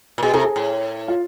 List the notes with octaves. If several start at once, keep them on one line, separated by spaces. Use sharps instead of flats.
A#2
B2 G#4
C3 A4
G#4
A2
F4